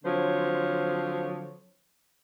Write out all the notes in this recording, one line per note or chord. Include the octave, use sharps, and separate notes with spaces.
D3 F3 F#3 C4 C5 C#5